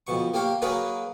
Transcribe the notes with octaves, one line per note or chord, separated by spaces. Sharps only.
F2 B2 C#6
A#3 G4 C#5 F5
F#3 A#3 G#4 A#4 B4 C#5